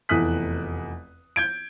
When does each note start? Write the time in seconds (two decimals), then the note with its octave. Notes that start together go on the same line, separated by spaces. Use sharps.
0.09 F1 E2 A3 D#6 F#6 B6
1.36 G6 G#6 D7